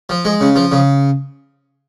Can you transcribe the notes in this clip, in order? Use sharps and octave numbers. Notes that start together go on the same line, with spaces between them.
F3
G#3
C#3
F3
C#3